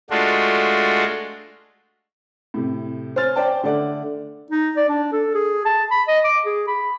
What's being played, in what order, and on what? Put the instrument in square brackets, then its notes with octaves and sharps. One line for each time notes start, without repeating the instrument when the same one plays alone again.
[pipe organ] G#3 A3 D4 F4 F#4
[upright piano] A2 C3
C5 C#5 G#5 F6 A6
C5 D5 G5 A5
D3 A3 D4 D5 F#5
[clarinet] D#4
D5
D4
A4
G#4
A5
B5
D#5
D6
G#4
B5